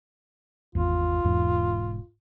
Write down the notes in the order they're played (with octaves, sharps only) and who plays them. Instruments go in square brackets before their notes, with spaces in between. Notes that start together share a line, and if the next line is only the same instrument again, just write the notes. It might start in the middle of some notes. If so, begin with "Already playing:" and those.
[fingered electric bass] G#1 E2 [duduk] F4
[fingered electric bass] E1 E2 G#2